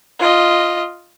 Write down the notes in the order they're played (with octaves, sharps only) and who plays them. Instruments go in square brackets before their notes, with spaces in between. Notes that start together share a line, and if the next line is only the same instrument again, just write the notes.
[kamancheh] F4 D#5